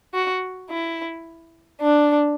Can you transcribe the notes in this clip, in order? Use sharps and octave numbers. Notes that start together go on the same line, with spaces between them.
F#4
E4
D4